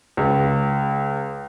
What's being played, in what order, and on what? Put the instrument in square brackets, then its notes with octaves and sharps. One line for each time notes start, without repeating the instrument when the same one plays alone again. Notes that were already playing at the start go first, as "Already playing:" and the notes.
[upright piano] C#2